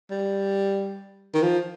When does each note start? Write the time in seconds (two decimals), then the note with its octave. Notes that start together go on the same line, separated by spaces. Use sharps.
0.11 G3
1.34 D#3
1.43 F3